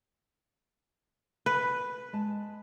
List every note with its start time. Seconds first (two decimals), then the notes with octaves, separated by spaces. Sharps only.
1.46 B4
2.13 G#3 A5